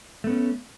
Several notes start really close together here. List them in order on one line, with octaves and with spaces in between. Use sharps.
A3 B3 C#4